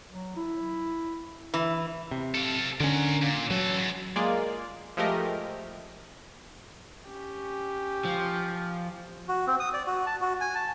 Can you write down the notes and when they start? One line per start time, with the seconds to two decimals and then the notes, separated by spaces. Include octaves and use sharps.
0.10 F#3
0.36 E4
1.54 E3
2.11 C3
2.34 A4 F5
2.80 D3 C#4 A#4 F#5
3.22 A#2
3.51 E3 F#3 A4
3.78 G#2
4.16 G#3 A#3 F4 G#4 D5
4.97 F3 G#3 A3 G4 A#4 D#5
7.07 C#4 G4
8.05 F3
9.28 F#4
9.47 C4
9.60 D#6
9.74 D5
9.87 F#4
10.06 A5
10.21 F#4
10.41 G#5
10.55 A5